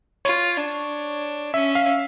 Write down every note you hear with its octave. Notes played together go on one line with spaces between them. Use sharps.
F4 C#5
D4
C#4 E5
F5